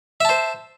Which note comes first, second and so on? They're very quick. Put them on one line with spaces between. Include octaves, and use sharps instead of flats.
E5 A5 C5